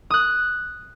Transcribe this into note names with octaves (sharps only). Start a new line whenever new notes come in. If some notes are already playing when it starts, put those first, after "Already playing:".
D#6 F#6